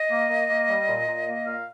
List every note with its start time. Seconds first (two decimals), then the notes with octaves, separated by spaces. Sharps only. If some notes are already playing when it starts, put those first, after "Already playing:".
Already playing: D#5
0.09 A#3
0.29 A#3
0.49 A#3
0.69 G3
0.88 A#2
1.07 A#2
1.27 A#3
1.46 A#2 F5